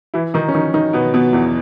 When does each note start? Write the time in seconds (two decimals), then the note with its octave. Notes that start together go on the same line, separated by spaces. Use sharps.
0.14 E3 E4
0.34 D#3 D#4
0.48 C#4
0.55 D#3 D#4
0.74 D#3 D#4
0.93 B2 B3
1.14 B2 B3
1.33 E2 E3